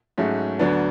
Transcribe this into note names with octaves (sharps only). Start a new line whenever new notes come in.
G#2 F#3 A3 C#4
D2 D3 F#3 B3 D4